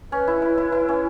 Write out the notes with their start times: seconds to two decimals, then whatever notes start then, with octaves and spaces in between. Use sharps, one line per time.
0.12 C#4 B4
0.27 E4
0.42 E4
0.58 E4
0.72 E4
0.89 C#4